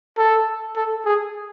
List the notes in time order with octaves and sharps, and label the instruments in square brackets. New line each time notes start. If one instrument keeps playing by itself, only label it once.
[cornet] A4
A4
G#4